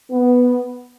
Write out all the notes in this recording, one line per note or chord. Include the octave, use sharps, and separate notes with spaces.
B3